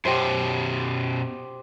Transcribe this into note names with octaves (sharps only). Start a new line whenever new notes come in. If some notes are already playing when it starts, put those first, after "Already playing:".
F#2 B2 G4 C5